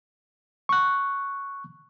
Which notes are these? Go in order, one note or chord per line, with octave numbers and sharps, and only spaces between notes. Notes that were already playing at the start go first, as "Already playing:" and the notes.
C#6 F#6